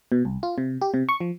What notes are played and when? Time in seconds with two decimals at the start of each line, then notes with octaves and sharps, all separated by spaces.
0.12 B2
0.25 C2
0.43 F4
0.58 C3
0.82 G4
0.94 C3
1.09 C#6
1.21 F3